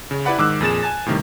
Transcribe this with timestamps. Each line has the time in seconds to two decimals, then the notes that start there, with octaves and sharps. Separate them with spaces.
0.11 C#3
0.25 E4 G4 B4 D5 F#5 B5
0.38 G#2 D#3 D6 E6 F#6
0.61 F2 A#2 G#4 A6 E7
0.83 G#5 A5 A6
1.06 A2 C3 D#3 G3